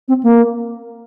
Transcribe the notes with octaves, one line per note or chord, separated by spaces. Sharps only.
C4
A#3